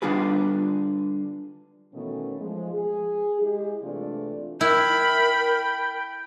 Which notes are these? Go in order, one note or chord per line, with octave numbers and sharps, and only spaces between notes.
D3 G3 D4 F4 G#4 B4
B2 D#3 E3 A3 C#4
F3 G#3
G#4
G#3 E4 G4
C3 E3 A3 D4 F4 D5
E4 A#4 G5 B5